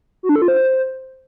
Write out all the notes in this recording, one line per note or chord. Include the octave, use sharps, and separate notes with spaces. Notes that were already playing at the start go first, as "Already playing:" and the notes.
F#4
D4
A4
F4
C5